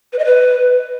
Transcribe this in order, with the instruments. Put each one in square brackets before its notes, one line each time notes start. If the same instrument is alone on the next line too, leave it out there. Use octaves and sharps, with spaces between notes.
[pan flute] B4
D#5
B4